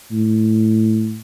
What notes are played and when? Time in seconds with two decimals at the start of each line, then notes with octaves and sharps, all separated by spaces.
0.12 A2